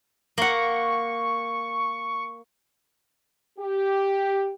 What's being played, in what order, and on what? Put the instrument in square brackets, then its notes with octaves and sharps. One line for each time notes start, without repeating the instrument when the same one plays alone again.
[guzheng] A#3 F#5 [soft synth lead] C#6
[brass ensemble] G4